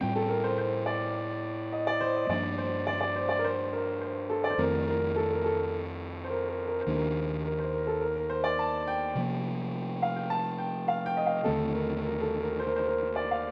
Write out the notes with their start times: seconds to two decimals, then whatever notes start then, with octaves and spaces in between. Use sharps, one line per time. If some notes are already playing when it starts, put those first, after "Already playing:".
0.01 A2 G3 C4 G5
0.16 A4
0.29 A#4
0.44 C5
0.58 C5
0.86 D5
1.72 D#5
1.87 D5
2.01 C5
2.15 D#5
2.29 G2 F3 A#3 D4 D5
2.58 C5
2.87 D5
3.01 D5
3.16 C5
3.29 D5
3.39 A#4
3.44 C5
3.73 A#4
4.01 C5
4.30 A4
4.44 D5
4.50 C5
4.58 F2 D#3 A3 C4 A#4
4.87 A#4
5.16 A4
5.33 A#4
5.44 A4
6.24 C5
6.30 A#4
6.49 A#4
6.68 A#4
6.81 C5
6.87 D#2 D#3 A#3 D4
6.95 A#4
7.44 A#4
7.59 C5
7.73 A#4
7.87 A4
8.01 A#4
8.16 A#4
8.30 C5
8.44 D5
8.59 A5
8.87 G5
9.15 C3 F3 A#3
10.02 F5
10.16 G5
10.30 A5
10.58 G5
10.88 F5
11.06 G5
11.17 D#5
11.26 F5
11.44 D#2 D3 A3 C4 A4
11.73 A#4
12.02 A#4
12.22 A4
12.40 A#4
12.60 C5
12.68 A#4
12.76 C5
12.87 A#4
13.16 D5
13.31 F5